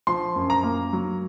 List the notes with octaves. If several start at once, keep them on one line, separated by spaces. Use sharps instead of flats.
F3 C6
F#2
A#5
A#3
F#3